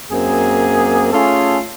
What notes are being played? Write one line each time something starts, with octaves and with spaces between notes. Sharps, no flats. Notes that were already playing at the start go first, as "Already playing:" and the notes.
F#2 A#3 C4 G#4
A3 C#4 F4 G#4 A4